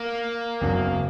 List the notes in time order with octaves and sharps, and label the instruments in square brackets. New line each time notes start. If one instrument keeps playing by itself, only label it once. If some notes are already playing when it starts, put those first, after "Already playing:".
Already playing: [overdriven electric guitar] A#3
[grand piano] F#1 E2 C#3 F#3